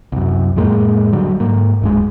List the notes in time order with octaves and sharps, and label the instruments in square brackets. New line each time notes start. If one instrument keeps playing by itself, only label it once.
[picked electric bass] C2 F#2
F2 A2 G#3 A#3
D3 F#3 G3
G#2 A#3
D1 G2 G#3